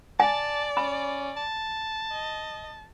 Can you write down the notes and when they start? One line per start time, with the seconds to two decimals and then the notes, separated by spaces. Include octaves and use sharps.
0.20 D5 G#5 A5
0.77 C#4 B5
1.37 A5
2.12 D#5